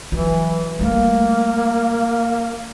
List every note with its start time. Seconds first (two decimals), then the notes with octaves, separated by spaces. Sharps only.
0.12 E3 F#3
0.79 G3 A3 A#3